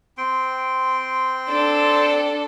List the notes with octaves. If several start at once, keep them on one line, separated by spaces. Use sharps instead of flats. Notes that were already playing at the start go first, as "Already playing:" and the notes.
C4 G5 C6
D4 A4